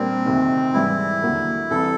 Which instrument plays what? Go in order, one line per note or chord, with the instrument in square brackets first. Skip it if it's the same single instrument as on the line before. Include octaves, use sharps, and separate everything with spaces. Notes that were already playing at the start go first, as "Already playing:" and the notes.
Already playing: [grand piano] A#2 G3 A#3 D4 [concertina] C4
[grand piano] D2 C3 D#3
[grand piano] G#2 E3 G3 [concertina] E4
[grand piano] D#2 D3 F#3 A#3
[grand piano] C2 C3 E3 [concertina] A4